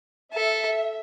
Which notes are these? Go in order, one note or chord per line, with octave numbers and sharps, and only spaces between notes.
A4 E5